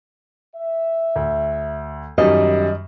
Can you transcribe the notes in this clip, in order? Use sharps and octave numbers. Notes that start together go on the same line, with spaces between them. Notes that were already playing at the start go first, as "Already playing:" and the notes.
E5
D2
F#2 D#3 G3 D#5